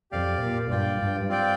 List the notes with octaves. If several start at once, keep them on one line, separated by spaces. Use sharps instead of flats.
F2 G4 D5 F5
A#2
G2 F4 D5 G5
G2
C4 F4 D5 G5